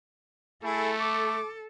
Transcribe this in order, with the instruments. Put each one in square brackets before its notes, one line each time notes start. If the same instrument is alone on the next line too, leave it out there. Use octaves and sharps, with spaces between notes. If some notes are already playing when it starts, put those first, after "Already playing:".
[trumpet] A3 [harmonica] E4 G#4 [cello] A4
[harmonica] D6